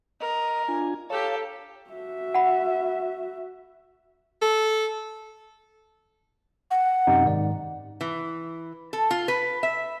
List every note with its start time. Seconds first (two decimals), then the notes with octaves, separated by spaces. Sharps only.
0.20 A#4 D#5
0.68 D4 F4 G#5
1.10 G4 A4 C#5 F5 A5
1.90 F#4 E5
2.34 F#5 B5
4.42 A4
6.71 F#5
7.07 F#2 C3 D#4
7.25 G#2 D#3 D5
8.01 E3
8.93 A4
9.11 F4
9.28 B4
9.63 E5